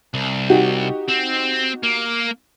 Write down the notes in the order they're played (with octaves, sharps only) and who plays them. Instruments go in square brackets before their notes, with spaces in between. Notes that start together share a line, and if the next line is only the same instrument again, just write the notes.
[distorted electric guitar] C2
[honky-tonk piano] D#4 F#4 G4
[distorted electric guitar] C4
A#3